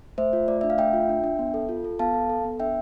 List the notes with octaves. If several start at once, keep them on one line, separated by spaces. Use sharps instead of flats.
A3 C5 E5
F4
A3 D5
D4 E5
F5
A3 E5 G5
F4
D4
D4
B3
A4
F4
A4
B3 F5 A5
A4
A4
B3
D4 E5 G5